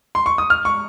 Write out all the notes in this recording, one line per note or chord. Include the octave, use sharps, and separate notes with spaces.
C6
C#6
D#6
F6
C#6